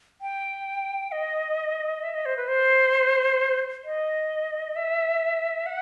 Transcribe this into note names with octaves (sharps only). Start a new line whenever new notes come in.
G5
D#5
E5
D#5
C5
B4
C5
D#5
E5
F#5